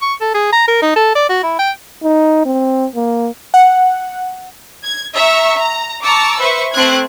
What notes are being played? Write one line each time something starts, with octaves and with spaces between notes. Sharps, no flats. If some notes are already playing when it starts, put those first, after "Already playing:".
C#6
A4
G#4
A#5
A#4
D#4
A4
D5
F#4
E4
G5
D#4
C4
A#3
F#5
G#6
E5 A#5 C#6
A#5
A5 A#5 C#6 D6 E6
B4 C5 E5 C#6
A3 C4 F#6 G#6